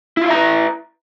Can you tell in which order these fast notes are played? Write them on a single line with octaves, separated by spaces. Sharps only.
E4 F4 E5 A#5 B4